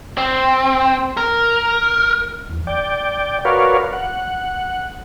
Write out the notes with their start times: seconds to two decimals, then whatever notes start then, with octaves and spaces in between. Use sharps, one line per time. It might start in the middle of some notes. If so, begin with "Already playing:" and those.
0.17 C4
1.17 A#4
2.50 E2
2.67 D5 G5
3.45 F#4 A#4 B4 C#5 D5 F5
3.93 F#5